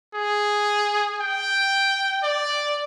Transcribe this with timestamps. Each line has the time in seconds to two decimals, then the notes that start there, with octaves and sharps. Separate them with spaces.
0.14 G#4
1.21 G5
2.23 D5